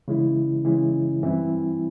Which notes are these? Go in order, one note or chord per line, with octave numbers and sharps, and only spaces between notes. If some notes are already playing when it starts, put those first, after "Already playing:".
C#3 E3 G#3 C#4 E4
C#3 E3 G#3 C#4 E4
G2 E3 G3 C4 E4